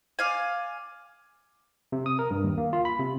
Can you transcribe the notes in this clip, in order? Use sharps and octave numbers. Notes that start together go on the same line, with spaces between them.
D5 F5 G#5
C3
D#6
A#4
G2
D#2
A#3
F4
B5
C3